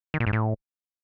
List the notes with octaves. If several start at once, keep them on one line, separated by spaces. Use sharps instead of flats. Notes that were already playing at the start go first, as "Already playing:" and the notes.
D#3
A#2
G#2
A2